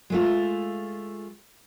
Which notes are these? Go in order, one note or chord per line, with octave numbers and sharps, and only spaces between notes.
G#3 A3 F4